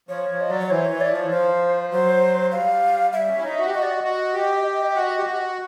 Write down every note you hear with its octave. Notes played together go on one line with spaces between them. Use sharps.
F3 C#5
F3
D#5
F#3 D5
C#5
E3 C5
C#5
E3
D5
F3 C#5
E3
F3 C5
F#3 C5
G3 F5
G3 E5
C#4
E4
D#4
F#4
G4
F#4 D#5
D5
E5
D#5
F#4
G4
F#4
G4
F#4